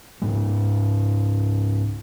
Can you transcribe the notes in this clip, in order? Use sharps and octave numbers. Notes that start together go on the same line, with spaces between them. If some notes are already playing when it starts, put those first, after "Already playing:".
C#2 G#2 G#3